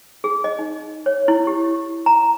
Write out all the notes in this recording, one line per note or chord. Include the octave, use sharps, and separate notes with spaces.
G#4
D#5
D#4
C#5
E4
G4
A#5